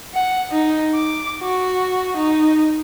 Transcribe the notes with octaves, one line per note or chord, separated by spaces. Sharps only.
F#5
D#4
D6
F#4
D#4